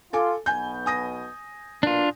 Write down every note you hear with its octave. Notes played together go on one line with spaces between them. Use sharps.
F4 A4 G#5 D6
B1 B2 B3 G#5 G6
G#5 D#6 A#6
B1 A#2 D4 F4